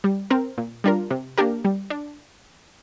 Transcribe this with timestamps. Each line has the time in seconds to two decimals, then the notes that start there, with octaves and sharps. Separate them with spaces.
0.04 G3
0.30 C4 A#4
0.58 A#2
0.84 G3 D4 F4 A#4
1.11 C3
1.38 A#3 D4 G4 A#4
1.65 G3
1.90 D4